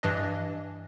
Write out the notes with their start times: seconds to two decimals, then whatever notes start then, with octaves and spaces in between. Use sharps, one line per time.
0.03 G2 E3 D4 D#5